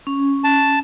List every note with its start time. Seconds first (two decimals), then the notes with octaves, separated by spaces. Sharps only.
0.07 C#4
0.44 A5